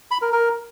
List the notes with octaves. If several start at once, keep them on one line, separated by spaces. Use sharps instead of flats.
B5
A#4
A#4